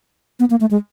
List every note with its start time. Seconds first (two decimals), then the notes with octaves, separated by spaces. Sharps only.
0.40 B3
0.50 A#3
0.61 A3
0.71 G#3